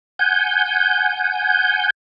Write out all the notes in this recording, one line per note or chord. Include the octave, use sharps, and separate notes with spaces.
F#5 G#5 G6